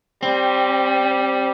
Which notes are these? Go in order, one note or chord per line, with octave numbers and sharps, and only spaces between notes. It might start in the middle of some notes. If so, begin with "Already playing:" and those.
G3 C4